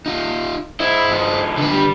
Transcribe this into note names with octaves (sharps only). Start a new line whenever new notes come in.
D#4 F4
E4 C5 D#5
D#3 F3
D3 B4
G3